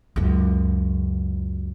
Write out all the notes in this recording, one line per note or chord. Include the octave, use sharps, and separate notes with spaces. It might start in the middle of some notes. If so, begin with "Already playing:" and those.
C#2 F#2